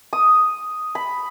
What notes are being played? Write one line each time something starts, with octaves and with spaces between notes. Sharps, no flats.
D#6
B5